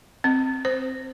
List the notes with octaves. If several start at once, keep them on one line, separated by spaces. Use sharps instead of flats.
C4
C5